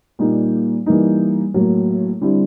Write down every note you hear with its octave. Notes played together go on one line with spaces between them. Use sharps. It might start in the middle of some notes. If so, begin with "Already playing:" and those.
A#2 G3 A#3 D#4
E3 G3 A#3 D#4
A2 F#3 A#3
D3 G3 C4 E4